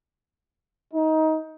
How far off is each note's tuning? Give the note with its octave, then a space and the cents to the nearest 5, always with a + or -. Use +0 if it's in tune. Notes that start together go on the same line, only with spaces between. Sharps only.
D#4 +20